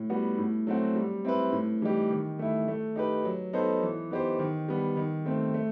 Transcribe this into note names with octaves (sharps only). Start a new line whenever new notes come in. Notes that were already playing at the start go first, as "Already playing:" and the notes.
Already playing: A2
G3 B3 F#4
A2
F#3 A3 C4 F#4
G3
C4 E4 B4
A2
E3 G3 D#4 G4
D#3
A3 E4
A3
D#4 G4 B4
F#3
B3 D#4 A4 C5
E3
B3 D#4 G4 C5
D#3
G3 B3
D#3
A3 C4
A3